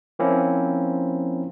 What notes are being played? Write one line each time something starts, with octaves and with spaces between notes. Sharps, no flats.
F3 A#3 C4 C#4 E4